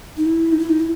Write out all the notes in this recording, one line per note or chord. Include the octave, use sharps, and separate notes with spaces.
D#4
E4
D#4
E4
D#4
E4